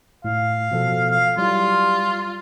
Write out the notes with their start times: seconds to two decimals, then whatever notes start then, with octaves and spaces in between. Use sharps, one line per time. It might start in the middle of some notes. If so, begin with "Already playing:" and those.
0.25 A2 F5
0.71 B2 F3 A4
1.11 F5
1.37 F#3 G3 E4 F4